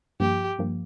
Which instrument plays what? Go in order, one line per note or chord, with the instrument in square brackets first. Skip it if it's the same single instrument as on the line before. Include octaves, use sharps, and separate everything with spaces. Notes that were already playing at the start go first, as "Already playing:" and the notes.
[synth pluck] G2 F3 A#3 [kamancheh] G4
[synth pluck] G2 F3 A#3